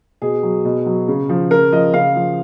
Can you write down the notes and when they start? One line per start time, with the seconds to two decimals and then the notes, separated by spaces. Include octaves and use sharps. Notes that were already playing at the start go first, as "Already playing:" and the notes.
0.22 B2 G#4
0.43 F#3
0.65 B2
0.86 F#3
1.08 C#3
1.29 F3
1.51 C#3 A#4
1.72 F3 D#5
1.94 C#3 F5
2.16 F3